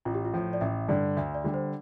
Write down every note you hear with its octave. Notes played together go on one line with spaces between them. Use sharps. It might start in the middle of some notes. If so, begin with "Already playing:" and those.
A1 F4
G4
F4
A2 F3
D5
A1 E5
G2 D3 D5
D2 E5
D5
D3 G3
C5